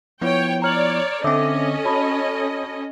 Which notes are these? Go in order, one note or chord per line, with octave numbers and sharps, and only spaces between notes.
F3 B3 E4 C#5 G5
C#5 D5 A#5 F6 F#7
D3 C4 C#4 A4 D#5 E5 D6
F#4 C#5 A5 B5